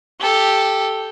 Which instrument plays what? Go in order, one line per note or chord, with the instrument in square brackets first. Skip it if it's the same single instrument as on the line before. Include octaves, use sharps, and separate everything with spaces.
[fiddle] G4 A4